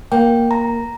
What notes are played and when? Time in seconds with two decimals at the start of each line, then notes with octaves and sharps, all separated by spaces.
0.12 A#3 G5
0.51 A#5